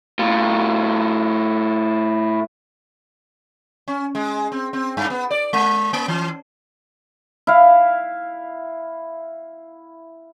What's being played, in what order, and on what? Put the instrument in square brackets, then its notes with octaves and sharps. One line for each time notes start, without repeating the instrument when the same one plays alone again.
[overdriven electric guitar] A2 F4
[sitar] C#4
G#3
C4
C4
G2
B3
D5
G#3
A#3
E3
[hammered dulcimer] E4 F5